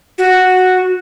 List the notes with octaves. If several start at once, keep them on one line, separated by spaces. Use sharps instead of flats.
F#4